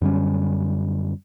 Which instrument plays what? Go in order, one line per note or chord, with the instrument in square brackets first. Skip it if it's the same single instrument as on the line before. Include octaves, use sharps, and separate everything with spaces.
[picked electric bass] F#2 D3 G3 C#4